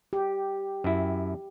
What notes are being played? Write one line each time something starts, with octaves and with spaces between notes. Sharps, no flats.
G4
F#2 E4